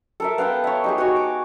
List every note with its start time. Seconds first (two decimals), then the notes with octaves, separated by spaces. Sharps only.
0.20 A4 A#4 E5
0.38 B3 F5 G5 A5
0.64 C#5 E5
0.84 D#4 G4 G#4
0.98 F#4 C#5 D#5 G#5
1.16 D6